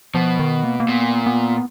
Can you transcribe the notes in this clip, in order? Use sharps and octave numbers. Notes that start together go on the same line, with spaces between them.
B2 F3
D#3
A#3
A#3
A#2 B3
B3